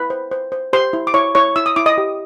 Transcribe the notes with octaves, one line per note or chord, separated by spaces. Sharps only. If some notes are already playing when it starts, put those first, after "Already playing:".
Already playing: E4 B4 B5
C5
C5
C5
G4 C5 C6
E4
D6
E4 C#5 C#6
E4 C#5 C#6
E4 E6
D#6
E4 D6
D#5 D#6
G4